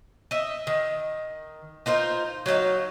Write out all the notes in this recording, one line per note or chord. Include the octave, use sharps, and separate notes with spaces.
D#5 E5
D#3
D#4 F4 A#4 C5
F#3 D#4 D#5 F5